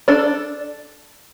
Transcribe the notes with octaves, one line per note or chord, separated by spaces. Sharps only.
D4 A4 D5